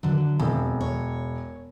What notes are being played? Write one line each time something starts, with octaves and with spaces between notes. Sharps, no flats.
D3 F#3
E1 F2
C#5